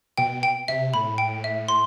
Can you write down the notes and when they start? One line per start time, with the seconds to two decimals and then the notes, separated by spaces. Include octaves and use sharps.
0.17 B2 G5
0.43 G5
0.68 C3 E5
0.94 A2 B5
1.18 G5
1.44 E5
1.68 C6